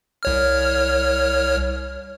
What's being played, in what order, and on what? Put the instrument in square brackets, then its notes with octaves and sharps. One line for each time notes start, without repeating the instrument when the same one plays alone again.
[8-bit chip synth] C2 C#5 F6